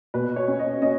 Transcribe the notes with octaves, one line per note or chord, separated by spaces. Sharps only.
B2 B4
C#5
C#4
D#5
C#4 D#5